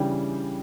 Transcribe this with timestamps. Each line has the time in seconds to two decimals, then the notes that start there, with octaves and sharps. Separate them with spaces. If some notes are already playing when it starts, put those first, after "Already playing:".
Already playing: C#3 E3 G3 D4 G5